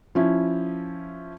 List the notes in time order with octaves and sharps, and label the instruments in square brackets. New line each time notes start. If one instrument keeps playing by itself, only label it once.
[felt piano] F3 C#4 E4